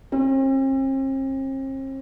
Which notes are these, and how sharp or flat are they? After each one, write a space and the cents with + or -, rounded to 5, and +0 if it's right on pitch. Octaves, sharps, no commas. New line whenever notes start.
C4 +45